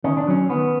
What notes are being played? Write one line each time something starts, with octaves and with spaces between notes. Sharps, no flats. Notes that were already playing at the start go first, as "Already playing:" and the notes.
D#3 C#4
D4
F#3 C#4
D#3 B3